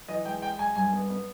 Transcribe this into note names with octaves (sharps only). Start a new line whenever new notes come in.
E3 D#5
G#3 G5
G#3 G5
G#3 G#5
G2 G#5
B3
B3